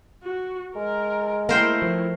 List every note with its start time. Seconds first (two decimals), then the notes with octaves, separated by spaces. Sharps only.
0.23 F#4
0.76 G#3 A#4
1.49 A3 A#3 E4 A#4 C5 G5
1.82 F3